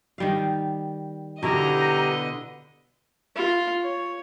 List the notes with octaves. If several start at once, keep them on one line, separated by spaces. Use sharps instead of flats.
D#3 G3 F5
B2 D3 E4 G4 A#4 B4 D#5 A#5
F4
C#5